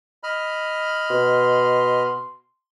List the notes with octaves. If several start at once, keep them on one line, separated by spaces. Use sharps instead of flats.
D#5 B5 F6
B2 C6